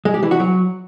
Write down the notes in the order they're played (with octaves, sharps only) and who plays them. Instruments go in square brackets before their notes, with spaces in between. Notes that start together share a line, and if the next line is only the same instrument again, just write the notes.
[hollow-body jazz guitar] G#3
G4
E3
F#4
F#3